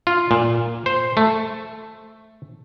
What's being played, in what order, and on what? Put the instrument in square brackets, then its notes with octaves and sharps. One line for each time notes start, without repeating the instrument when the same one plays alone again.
[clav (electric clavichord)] F4
A#2
C5
A3